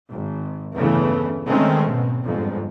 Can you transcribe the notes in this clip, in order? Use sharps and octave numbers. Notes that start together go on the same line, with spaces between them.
G#1
G1 E2 C#3 E3 A3
D#3 G#3 A3 C4 C#4
G#2 B2
G1 F2 G#2